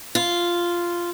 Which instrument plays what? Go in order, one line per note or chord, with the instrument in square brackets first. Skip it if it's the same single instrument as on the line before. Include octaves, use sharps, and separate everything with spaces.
[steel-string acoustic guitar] F4